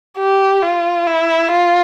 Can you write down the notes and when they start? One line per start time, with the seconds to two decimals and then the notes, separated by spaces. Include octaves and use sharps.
0.19 G4
0.62 F4
1.07 E4
1.51 F4